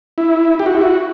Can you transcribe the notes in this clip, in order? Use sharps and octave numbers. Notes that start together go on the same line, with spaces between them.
E4
G4
F#4
E4
F#4